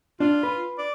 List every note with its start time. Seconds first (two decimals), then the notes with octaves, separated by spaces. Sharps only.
0.20 D4 F4
0.43 B4
0.78 D5